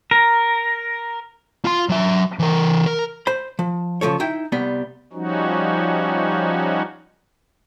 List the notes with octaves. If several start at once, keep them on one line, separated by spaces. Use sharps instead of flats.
A#4
F4 C6
F#3 E5
E3 A#4
A#4
C5 B5
F3
C#3 F3 A4 C#5
D#4 E4 E5 G5
C2 G3 B3
F3 G3 C#4 D#4 F#4